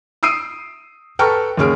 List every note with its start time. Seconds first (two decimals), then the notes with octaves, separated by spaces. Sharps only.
0.23 D#6 E6 C7 D7 D#7
1.19 A4 B4 G5 A#5 C#6 F6
1.57 D#2 C#3 C#4 G#4 F6 D7